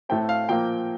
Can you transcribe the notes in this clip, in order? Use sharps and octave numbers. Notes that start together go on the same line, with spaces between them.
A2 A3 C4 G5
F5
A#2 F3 A#3 G5